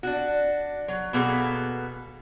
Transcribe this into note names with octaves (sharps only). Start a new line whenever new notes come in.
D4 F#4
F#3
B2 A#3 B3 G#4 A4